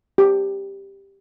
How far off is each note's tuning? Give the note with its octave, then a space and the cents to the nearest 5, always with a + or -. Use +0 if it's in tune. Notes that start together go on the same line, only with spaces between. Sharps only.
G4 +5